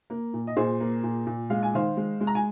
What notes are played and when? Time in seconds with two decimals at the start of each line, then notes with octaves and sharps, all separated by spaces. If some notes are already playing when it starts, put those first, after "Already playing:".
0.10 A#3
0.34 A#2
0.47 D#5
0.57 A#2 G#4 C5
0.80 A#3
1.04 A#2
1.27 A#2
1.50 G#3 F5
1.63 G#5
1.73 D#3 C5 F5
1.97 G#3
2.20 G#3
2.27 A#5
2.35 G#5